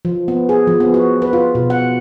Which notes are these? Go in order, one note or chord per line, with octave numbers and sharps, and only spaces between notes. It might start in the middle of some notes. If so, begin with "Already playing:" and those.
F3
B3
G#4
F3
B3
F#4
B4
F4
B2
F#5